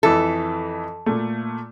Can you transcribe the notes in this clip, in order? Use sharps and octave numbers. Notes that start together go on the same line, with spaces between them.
F2 E3 A4 E5
A#2 A3